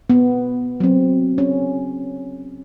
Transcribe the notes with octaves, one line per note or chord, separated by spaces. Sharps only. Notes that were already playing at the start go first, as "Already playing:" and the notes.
B3
F#3 C4
C#4